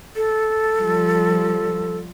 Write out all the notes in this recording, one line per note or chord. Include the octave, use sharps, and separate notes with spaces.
A4
F3 G3